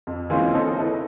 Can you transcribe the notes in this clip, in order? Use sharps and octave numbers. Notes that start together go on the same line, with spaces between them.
F2
E3 G#3 A#3 C4 C#4 F4
A#3 C4 D#4 A4 C#5
D#4 E4 A4 B4